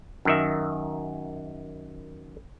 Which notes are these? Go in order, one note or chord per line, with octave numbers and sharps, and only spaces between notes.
F#2 D#3 E5